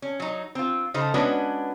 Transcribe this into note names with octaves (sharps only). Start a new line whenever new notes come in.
C#4
F#3 D#4
C4 F4
C#3 D#4 A4 C5
G#3 B3 C#4 D4 F#4 B4